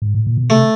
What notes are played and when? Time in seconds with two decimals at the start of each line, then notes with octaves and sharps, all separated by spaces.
0.02 G#2
0.15 A2
0.27 A#2
0.37 B2
0.50 C3 A3